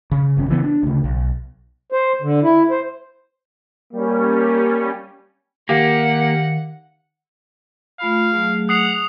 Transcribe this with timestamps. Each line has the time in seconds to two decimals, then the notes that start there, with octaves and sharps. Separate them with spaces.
0.12 C#3
0.37 G#1 G2 C#4
0.48 C#3 E3 B3
0.64 D4
0.83 D2 C#3
1.04 B1
1.92 C5
2.22 D3
2.43 E4
2.71 C5
3.93 G3 A#3 C#4
5.69 D#3 A#3 G4 F5 F#5
8.00 A3 F4 F5 B5
8.32 F#3 A3 G#4
8.69 F#5 D#6 C7 F7